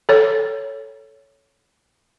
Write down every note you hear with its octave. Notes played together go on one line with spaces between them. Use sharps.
A4 C#5